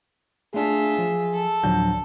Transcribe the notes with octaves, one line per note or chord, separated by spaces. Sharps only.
A3 D4 F4 G#4 E5
F3
A4
D1 D3 F3 F#3 G6